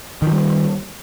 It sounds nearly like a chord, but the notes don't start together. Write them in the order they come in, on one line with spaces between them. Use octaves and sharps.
D#3 F3 G3